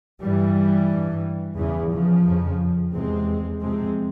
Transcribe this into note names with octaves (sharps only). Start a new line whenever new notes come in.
G2 E3 G3
G2
E2 C#3 E3
C#3 F3
F2 C#3
E2 C3 G#3 C4
F2 C3 G#3 C4